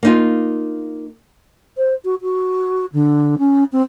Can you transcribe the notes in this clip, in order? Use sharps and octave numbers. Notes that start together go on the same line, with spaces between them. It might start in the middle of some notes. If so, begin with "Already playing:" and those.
A#3 D#4 F4
C5
F#4
F#4
D3
C#4
C4